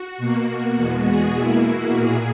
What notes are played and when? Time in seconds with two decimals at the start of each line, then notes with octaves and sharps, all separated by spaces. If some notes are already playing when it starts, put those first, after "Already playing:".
Already playing: F#4
0.18 B2 A#3
0.77 E2 B2 G#3 B3
1.08 G#4
1.37 B2 A#3 E4
1.67 F#4
1.96 A#2 A#3 G#4